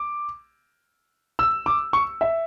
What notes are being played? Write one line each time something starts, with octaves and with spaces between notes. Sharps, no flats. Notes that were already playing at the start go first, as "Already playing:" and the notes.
Already playing: D6
E6
D6
C#6
E5